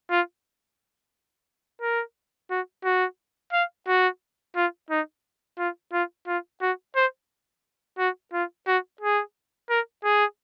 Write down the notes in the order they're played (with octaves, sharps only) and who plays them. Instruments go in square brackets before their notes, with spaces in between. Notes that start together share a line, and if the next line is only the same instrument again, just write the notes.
[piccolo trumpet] F4
A#4
F#4
F#4
F5
F#4
F4
D#4
F4
F4
F4
F#4
C5
F#4
F4
F#4
G#4
A#4
G#4